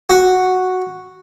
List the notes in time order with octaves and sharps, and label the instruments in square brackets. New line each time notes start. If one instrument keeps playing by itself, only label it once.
[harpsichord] F#4